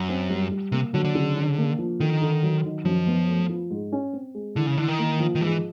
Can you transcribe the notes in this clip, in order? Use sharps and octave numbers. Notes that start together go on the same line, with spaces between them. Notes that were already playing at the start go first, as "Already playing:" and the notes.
Already playing: F#2
C4
G3
G3
C3 A#3
D3 F#3
D3
C#3
D4
A#3
F3
D3 D#3
D3
F#3
D#3
F#2 F3
B3
A3
F3
G#2
C#4
C4
G#3
D3 E3
C#3
D3 E3
D#3
A#3
F3
D#3
G#2 E3